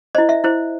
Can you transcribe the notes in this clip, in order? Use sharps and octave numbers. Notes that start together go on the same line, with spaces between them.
E4 C5 D#5
E5
E4 C5